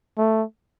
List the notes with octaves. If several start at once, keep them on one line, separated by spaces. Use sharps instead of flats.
A3